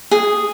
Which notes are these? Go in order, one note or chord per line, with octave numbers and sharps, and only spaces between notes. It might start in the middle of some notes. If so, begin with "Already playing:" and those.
G#4